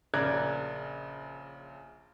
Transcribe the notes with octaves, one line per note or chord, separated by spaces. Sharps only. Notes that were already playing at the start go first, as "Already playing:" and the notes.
A#1 C#3 A#4 D5 F#6 G#6